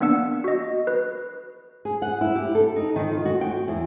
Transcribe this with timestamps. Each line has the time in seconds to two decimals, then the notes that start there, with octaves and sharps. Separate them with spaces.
0.01 A#3 B3 D4 F#5 E6
0.44 F#4 D#5
0.87 B4
1.85 G#4
2.02 F#5
2.21 E4
2.35 G4
2.55 A4
2.76 D#4
2.96 D#3
3.11 F4
3.25 F#4
3.41 G5
3.68 E2